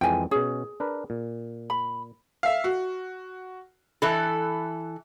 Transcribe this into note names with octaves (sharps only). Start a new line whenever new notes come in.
F2 E3 G#3 G5 G#5
B2 C#4 G#4
D4 A#4 B4
A#2
B5
E5 F5
F#4
E3 A4 B5 F#6